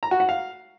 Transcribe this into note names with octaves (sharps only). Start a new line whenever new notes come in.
A#5
F#4
F#5
F5